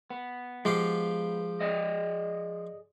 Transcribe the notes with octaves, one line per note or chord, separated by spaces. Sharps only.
B3
F3 G#3 G4 F5
G#4 D5 D#5